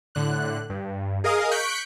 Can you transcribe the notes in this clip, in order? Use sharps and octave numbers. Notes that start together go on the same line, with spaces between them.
A2 D3 F#6
G2
G#4 A#4 D#5 F5 D#6
C#6 F#6 G6 B6 C#7 D7